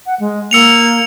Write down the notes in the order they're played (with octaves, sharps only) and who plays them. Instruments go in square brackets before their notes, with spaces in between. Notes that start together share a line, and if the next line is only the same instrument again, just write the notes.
[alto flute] F#5
G#3
[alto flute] A#3 [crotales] E6 C#7 F7